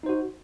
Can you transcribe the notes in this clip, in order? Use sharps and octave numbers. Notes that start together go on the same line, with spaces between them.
D#4 F#4 C5